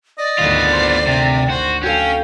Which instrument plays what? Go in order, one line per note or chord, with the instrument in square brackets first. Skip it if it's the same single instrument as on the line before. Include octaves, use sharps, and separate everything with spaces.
[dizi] D5 [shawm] D#5
[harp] G#1 D2 [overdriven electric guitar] B3 F4
[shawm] C5 [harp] C6
[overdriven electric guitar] C3
[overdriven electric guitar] F#4 [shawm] C5
[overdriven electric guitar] C#4 [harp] F#4 A4 F5 [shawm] G5